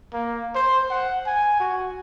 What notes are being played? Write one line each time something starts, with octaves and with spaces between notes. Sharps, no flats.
A#3
C5
F#5
G#5
F#4